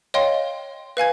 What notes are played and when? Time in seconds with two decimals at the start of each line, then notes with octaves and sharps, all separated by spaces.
0.14 C#5 D#5 F5 G5 C6
0.97 B4 F5 G#5 G#6